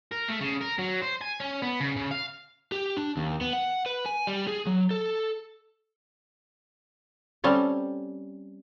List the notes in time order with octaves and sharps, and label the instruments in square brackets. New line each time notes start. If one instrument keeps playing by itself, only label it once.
[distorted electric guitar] A#4
A3
C#3
A#4
F#3
C5
G#5
C#4
B3
C#3
C#3
F5
[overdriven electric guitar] G4
D4
D#2
B3
F#5
B4
G#5
G3
G#4
F#3
A4
[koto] G3 C4 C#4 A4